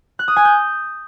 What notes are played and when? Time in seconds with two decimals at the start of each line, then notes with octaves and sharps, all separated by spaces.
0.19 F#6
0.28 D#6
0.36 G#5
0.45 G6